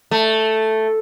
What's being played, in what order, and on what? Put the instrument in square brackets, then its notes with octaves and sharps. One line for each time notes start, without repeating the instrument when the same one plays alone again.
[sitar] A3